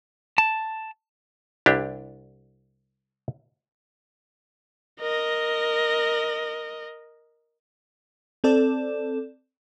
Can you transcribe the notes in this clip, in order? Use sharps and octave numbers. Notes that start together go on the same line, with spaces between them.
A5
C2 D4 E4 G4
A#4 D#5
C4 A4 D5